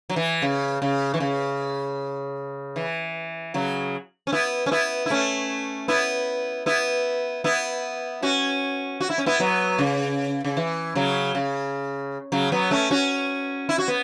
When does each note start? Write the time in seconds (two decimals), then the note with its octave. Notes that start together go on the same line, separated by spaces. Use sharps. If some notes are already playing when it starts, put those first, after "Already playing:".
0.10 F#3
0.16 E3
0.42 C#3
0.82 C#3
1.14 E3
1.20 C#3
2.76 E3
3.54 C#3 F#3
4.27 C#4
4.33 B3 E4
4.66 C#4
4.71 B3 E4
5.06 E4
5.10 A3 C#4
5.88 B3 E4
6.66 B3 E4
7.44 B3 E4
8.23 C#4 F#4
9.01 F#4
9.10 E4
9.18 C#4
9.26 B3 E4
9.40 F#3 B3
9.79 C#3
10.44 C#3
10.57 E3
10.95 C#3 F#3
11.35 C#3
12.32 C#3 F#3
12.52 F#3 B3
12.71 A3 C#4
12.91 C#4 F#4
13.69 E4
13.78 F#4
13.88 B3